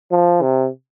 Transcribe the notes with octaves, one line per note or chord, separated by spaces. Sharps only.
F3
C3